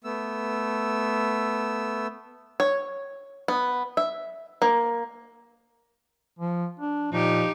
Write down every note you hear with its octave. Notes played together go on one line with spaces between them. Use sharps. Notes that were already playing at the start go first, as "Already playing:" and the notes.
A3 B3 E6
C#5
B3
E5
A#3
F3
D4
A#2 F3 D#4 G4